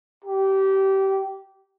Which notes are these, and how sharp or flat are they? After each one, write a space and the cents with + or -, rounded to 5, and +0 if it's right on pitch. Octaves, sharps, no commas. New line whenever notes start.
G4 -25